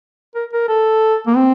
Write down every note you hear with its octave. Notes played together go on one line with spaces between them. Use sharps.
A#4
A#4
A4
A#3
C4